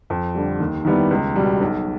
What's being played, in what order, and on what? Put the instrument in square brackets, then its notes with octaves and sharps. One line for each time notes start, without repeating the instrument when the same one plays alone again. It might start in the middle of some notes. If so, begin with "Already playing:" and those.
[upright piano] F2
D3 G3
D#2
D#3 G3 B3 E4
C#2
B2 G3
B1